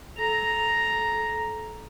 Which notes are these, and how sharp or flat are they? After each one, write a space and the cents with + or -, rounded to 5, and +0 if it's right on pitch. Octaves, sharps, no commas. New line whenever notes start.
A4 -25 A#5 +0